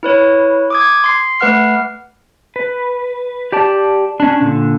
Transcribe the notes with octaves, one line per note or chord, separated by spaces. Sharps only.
E4 B4 C#5
D6 D#6 G#6
C6 C7
A3 B4 F#5 F6 C7
B4
G4 D5 A5
C#4 D4
A#2 D3